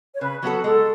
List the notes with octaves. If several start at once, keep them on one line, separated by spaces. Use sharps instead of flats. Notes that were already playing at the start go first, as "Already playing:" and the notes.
C#5
C#3 B4
F#3 B3 F#4 A4
G#3 A4